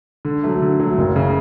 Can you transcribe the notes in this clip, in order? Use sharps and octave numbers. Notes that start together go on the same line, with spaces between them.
D3
F#3 A3
D3
F#3 A3
F#1
C#3